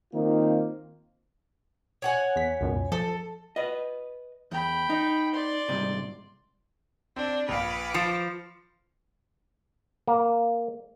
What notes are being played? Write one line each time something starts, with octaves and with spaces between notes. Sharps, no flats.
D#3 A#3 C4 D#4 F4
C#5 F#5 G#5
E2 B6
C#2 F#2 B2
F3 A4
B4 D#5
E2 G5 B5
D#4
D5 C6
C2 G#2 C3
C4 D4
A#1 B4 F5 D6
F3 A6 C#7 E7
A#3